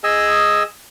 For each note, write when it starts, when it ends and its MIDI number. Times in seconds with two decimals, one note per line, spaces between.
0.04 0.63 68
0.04 0.63 75
0.04 0.63 80
0.04 0.63 88